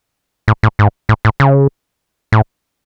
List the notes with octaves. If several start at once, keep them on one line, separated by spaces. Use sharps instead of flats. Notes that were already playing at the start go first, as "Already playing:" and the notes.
A2
A2
G#2
A2
A2
C#3
A2